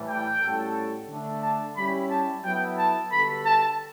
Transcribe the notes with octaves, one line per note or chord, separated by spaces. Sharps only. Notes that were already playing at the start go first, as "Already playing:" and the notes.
Already playing: A2 E3 G3
G5
A2 G3 C#4 F#4 A4
D3 A3 D4
A5
G3 C#4 E4 G4 B5
A5
F#3 B3 E4 A4 G5
A5
D3 G3 B3 F#4 A4 B5
A5